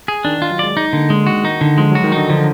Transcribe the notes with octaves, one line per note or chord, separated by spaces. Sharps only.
G#4
D#3 D4
D#3
F4
F#3
G#3 D5
G#3 D#4
D3 A#3
G#3 D4
D#3 F#4
D#3 D#4
D3 D#3
F3 G#3
F#3
F#4
D#3
D3 D#4
D3 F3